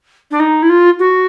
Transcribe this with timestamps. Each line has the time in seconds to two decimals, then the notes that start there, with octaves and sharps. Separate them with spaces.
0.31 D4
0.39 D#4
0.62 E4
0.69 F4
0.99 F#4